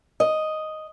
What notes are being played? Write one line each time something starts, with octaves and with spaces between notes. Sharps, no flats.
D#5